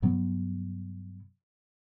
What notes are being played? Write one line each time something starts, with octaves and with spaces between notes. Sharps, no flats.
G2 C3 F#3 B3